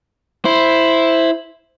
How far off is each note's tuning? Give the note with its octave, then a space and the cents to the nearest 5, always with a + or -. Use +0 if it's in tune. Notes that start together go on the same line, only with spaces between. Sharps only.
E4 +0 C5 +0